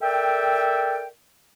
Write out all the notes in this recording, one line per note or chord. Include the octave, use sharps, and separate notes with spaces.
A4 A#4 D5 E5 G5